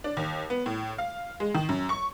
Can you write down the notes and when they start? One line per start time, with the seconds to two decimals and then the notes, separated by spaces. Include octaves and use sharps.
0.04 D4
0.17 D#2
0.50 B3
0.66 A2
0.98 F5
1.40 G#3
1.54 D#3
1.69 F#2
1.89 C#6